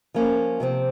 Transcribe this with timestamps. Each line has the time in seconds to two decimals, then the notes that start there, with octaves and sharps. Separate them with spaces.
0.14 F3 A#3 C#4
0.60 C3 F3 C4